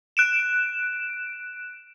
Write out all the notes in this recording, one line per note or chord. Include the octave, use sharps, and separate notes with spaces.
F#6 D7 E7